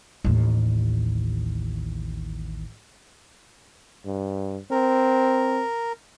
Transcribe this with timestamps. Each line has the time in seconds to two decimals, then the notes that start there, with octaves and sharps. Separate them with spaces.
0.24 A1 D#2
4.05 G2
4.71 C4 A#4